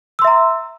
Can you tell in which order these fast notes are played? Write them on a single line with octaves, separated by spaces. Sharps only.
E6 C6 E5 A#5